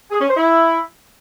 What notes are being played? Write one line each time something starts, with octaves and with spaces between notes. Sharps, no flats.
G#4
C#4
C5
E4